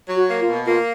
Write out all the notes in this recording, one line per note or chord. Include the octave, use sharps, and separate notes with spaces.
F#3
F#4
A#3
F4
B2
A#3 F4